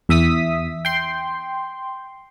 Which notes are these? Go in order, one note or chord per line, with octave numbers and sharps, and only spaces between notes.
E2 E5 D#6 B6
G5 C6